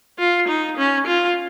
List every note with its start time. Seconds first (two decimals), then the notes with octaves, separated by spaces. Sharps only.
0.19 F4
0.48 D#4
0.77 C#4
1.07 F4